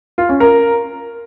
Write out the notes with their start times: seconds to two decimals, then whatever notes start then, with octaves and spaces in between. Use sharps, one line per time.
0.18 F4
0.29 C#4
0.40 A#4